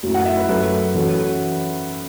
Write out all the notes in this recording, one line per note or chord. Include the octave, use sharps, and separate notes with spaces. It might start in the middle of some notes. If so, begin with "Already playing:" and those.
F#2 F#3 A3 E4
F#5
E5
B4
F#2 F#3 A3 F#4 A4 B4
E3 C#4 F#4 A4